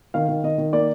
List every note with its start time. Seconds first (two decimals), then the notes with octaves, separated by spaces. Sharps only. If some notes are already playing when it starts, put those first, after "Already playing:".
0.14 D#3 F5
0.28 D#3
0.44 D#3 D#5
0.58 D#3
0.73 A#3 D5